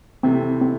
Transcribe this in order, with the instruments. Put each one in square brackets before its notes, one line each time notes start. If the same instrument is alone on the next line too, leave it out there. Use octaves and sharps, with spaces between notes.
[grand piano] C3 E3 A3 E4 [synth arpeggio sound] C4
[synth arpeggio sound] C4